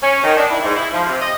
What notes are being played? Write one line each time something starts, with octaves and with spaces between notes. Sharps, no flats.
C#4
D#3
D4
E4
G#2
E4
F3
C3
D#5